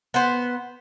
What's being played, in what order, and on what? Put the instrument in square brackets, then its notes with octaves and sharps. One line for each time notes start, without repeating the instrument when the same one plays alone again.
[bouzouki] B3 C5